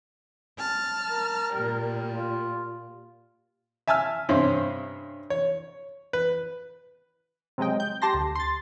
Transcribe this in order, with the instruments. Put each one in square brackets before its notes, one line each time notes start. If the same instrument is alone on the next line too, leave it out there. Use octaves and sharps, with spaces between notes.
[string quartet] A5 F6
[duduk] A#4
[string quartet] A#2 G3
[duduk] F4
[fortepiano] E5 G#5 A5 E6 F6
G2 C3 C4 C#4
C#5
B4
[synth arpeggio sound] C3 F#3 G#3 D#5 G5
G6
G4 A5 C6 A#6
D2
C6 A6